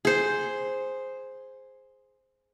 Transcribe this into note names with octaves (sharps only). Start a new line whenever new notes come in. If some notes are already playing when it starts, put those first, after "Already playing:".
G#4 C5